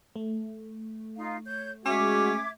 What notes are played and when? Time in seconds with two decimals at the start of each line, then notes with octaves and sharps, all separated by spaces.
0.16 A3
1.17 D#4 F4 F5
1.46 C#5 G6
1.86 G#3 C#4 F#4 E5 D6 G#6